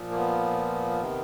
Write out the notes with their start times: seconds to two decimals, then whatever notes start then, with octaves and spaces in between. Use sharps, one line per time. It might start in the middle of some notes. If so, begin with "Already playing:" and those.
Already playing: A#2 F3
0.11 A#3
0.16 B3
1.01 C3 D#3